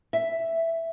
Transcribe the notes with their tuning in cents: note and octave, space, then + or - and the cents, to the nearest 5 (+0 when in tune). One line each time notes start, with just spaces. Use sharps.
E5 +5